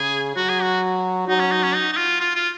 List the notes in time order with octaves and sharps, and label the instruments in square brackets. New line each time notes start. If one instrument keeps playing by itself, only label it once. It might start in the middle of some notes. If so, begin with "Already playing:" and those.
Already playing: [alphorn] C#3 [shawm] G#4
[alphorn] F#3 [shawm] F#4
[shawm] G#4
F#4
[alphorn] F#3 [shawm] D#4
[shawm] C#4
D#4
C#4
D#4
D#4
F4
F4
F4